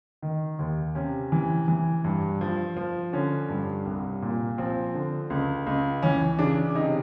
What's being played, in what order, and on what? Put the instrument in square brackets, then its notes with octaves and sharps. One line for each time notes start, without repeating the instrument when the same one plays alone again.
[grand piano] D#3
D#2
C3 C#4
E3
E3
G2
F3
F3
D3 C#4
G2
C2
A#2
F3 C4
D3
C#2
C#2
E3 C#4
C#3 D4
C3 D#4